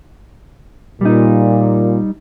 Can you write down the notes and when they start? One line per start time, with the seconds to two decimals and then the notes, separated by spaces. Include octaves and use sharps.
1.01 A#2 G3 D#4